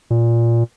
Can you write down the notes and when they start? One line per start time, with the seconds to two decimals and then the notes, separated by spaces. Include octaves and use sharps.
0.10 A#2